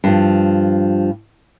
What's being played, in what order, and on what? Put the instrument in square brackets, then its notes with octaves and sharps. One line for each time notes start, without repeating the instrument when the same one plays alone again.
[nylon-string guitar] G2 F3